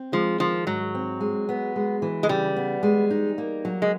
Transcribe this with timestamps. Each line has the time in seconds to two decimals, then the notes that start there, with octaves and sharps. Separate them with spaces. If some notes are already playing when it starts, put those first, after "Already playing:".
Already playing: C4
0.12 F3 G#3
0.40 D#3 F3
0.66 G#2 F#3
0.95 C4
1.20 G#3
1.49 B3
1.76 G#3
2.02 E3
2.23 G#3
2.29 C#3 G3
2.56 B3
2.83 G#3
3.11 D#4
3.38 A#3
3.65 F#3
3.82 G#3